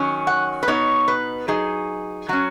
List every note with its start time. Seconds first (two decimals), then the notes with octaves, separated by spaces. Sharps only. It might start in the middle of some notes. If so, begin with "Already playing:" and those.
Already playing: D#3 F#3 C#4
0.27 F#5
0.63 B4
0.68 B2 B3 D#4 C#5
1.08 B4
1.48 F#3 D#4 G#4
2.28 F#3 C#4 F#4